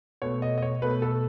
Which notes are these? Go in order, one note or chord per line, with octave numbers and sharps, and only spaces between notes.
B2 A3 C#5
D#5
D#5
C#5
B2 A3 B4
A4